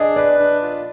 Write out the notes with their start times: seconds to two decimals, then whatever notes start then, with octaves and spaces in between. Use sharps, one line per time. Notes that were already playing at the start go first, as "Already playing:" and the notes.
Already playing: D4 G#4 D5 D#5
0.16 B4 D5
0.40 D4
0.62 F4